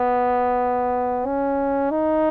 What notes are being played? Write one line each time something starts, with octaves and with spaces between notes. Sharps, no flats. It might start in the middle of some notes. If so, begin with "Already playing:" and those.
Already playing: B3
C#4
D#4